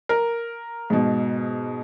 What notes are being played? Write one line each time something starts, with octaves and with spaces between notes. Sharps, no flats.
A#4
G#2 B2